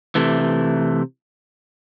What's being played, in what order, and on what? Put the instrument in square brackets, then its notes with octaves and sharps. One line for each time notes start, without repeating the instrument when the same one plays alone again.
[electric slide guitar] C3 E3 A3